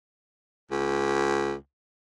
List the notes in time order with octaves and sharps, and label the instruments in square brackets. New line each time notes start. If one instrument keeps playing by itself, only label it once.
[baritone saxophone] C#2